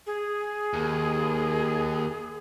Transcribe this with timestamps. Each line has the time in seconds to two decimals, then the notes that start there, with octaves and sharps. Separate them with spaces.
0.07 G#4
0.73 D#2